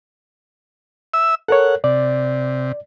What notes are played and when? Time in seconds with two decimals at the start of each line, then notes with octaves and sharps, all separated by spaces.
1.14 E5 E6
1.48 A4 A#4 C#5 F#5
1.84 C3 D5